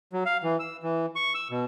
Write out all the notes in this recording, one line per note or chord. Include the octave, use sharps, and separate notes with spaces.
F#3
F5
E3
E6
E3
C#6
E6
B2